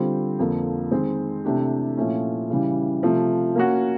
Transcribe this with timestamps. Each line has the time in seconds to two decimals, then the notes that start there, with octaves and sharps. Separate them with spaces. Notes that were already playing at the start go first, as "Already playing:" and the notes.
Already playing: D3 G3 C4 F4
0.39 F2 D3 F3 A#3
0.91 D#3 G#3 C4
1.45 C3 E3 A3 D4 G4
1.97 A#2 F3 A3 C#4 E4
2.50 C#3 E3 G3
3.03 C3 F3 A3
3.55 A#3 C#4 F#4